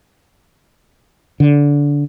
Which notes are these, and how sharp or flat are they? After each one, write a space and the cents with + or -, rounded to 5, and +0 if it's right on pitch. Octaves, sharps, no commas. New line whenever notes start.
D3 -20